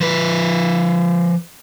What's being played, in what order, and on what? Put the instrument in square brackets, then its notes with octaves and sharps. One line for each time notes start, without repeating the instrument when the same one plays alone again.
[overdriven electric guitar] F3 B4